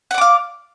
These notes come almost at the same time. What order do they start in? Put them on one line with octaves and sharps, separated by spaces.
F#5 D5 D6 F5